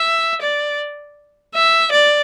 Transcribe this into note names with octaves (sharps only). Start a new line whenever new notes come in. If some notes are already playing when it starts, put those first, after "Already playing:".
Already playing: E5
D5
E5
D5